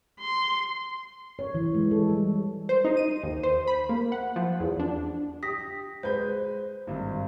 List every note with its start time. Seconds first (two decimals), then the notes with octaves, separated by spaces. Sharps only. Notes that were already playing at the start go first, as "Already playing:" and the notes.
0.20 C6
1.39 C#5
1.55 E3
1.75 G#3
1.91 A4
2.09 G3
2.69 C5
2.85 D#4
2.97 D#7
3.23 D#2
3.43 C5
3.67 B5
3.89 A#3
4.12 F#5
4.36 F3
4.60 E2
4.79 D4
5.43 G4 D#6 A#6 B6
6.03 G#3 B4 C5 G6
6.87 G#1 G2